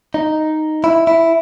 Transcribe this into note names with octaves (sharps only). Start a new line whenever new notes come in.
D#4
E4
E4